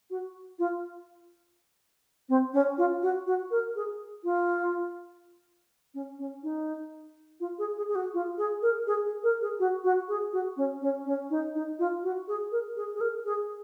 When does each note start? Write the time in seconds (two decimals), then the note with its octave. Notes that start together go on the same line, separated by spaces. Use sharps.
0.10 F#4
0.59 F4
2.29 C4
2.54 C#4
2.78 F4
3.03 F#4
3.27 F#4
3.51 A#4
3.76 G#4
4.24 F4
5.95 C#4
6.19 C#4
6.43 D#4
7.40 F4
7.59 G#4
7.77 G#4
7.89 G#4
7.95 F#4
8.14 F4
8.38 G#4
8.62 A#4
8.87 G#4
9.05 G#4
9.24 A#4
9.42 G#4
9.60 F#4
9.84 F#4
10.09 G#4
10.33 F#4
10.57 C#4
10.82 C#4
11.06 C#4
11.30 D#4
11.55 D#4
11.79 F4
12.03 F#4
12.28 G#4
12.52 A#4
12.76 G#4
12.95 G#4
13.01 A#4
13.25 G#4